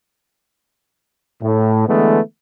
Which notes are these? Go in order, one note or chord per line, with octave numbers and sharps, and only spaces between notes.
A2
D3 E3 G#3 A3 B3